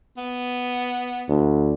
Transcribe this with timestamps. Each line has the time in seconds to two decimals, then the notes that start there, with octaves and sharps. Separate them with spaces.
0.17 B3
1.29 D2